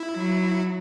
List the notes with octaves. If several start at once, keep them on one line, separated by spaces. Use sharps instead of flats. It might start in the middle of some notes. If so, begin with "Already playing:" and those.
Already playing: E4
F#3